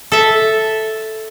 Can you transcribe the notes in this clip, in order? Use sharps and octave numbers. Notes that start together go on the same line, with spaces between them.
A4 E5